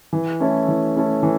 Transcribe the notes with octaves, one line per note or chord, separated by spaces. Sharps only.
E3
A3 C#4 E4 A4
E3
A3 C#4 E4 A4
E3